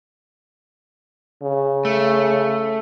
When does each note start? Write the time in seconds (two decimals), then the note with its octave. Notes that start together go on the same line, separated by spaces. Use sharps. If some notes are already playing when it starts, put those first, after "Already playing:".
1.43 C#3
1.85 A3